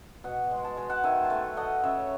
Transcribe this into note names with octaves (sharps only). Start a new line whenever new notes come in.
B2 D#5 F#5
G#3
A5
G#3
F#5 A5
D#3 E5 G#5
A5
A3 E5 G#5
A3 D#5 F#5
C#3 C#5 E5